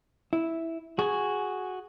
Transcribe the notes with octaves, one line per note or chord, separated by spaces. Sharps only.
E4
F#4 G#4 G#5